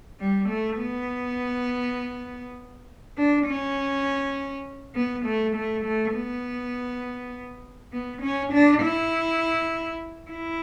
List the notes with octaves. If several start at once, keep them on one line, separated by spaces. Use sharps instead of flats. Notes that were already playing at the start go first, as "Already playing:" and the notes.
G3
A3
B3
D4
C#4
B3
A3
A3
A3
B3
B3
C#4
D4
E4
E4